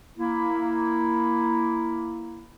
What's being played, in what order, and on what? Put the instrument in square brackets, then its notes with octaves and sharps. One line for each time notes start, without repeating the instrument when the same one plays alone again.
[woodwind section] A#3 E4